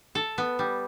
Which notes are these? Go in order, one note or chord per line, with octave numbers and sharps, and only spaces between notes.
A4
B3
G3